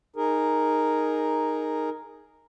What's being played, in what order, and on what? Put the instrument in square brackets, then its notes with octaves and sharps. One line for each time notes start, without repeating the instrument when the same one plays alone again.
[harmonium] D#4 G#4 A#4